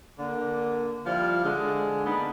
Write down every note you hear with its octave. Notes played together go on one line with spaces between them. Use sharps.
D3 A#3
F3 G3 E4 F5
D3 G#3
A#3 B3 D4 D#4